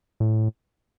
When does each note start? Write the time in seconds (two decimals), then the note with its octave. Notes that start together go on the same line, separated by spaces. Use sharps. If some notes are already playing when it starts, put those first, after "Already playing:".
0.20 A2